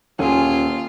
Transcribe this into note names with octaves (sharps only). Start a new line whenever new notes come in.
D#1 C#4 F4 G#4